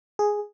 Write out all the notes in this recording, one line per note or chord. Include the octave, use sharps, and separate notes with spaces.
G#4